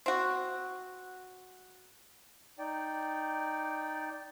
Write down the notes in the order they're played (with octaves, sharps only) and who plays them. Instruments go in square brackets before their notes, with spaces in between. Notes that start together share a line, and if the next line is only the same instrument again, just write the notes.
[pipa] C4 F#4
[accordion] D#4 D5 G5